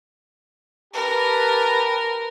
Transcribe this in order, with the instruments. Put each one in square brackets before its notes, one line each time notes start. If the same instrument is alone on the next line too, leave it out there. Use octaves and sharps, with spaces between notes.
[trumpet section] G4 B4 A5 [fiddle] A#4